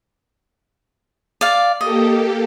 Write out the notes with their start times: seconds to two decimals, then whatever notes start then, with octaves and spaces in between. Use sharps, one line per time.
1.41 D5 F5
1.81 A#3 G4 A4 D#5